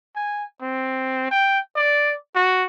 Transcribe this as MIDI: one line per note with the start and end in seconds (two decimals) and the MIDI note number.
0.16 0.44 80
0.61 1.29 60
1.31 1.59 79
1.76 2.13 74
2.35 2.67 66